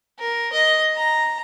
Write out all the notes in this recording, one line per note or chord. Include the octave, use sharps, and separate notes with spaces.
A#4
D#5
A#5